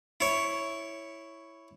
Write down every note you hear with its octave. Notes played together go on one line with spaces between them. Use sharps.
E4 C#5